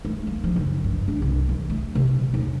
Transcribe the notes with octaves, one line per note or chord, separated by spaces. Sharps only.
A3
A#3
F3
F#1
G2
D4
C2
E3
A3
C3
A#2
D#2